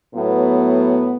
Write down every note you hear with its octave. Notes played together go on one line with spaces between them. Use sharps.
A2 F#3 B3